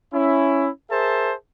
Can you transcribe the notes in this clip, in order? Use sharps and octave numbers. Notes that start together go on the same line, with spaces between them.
C#4 E4
G#4 A#4 C5 E5 A5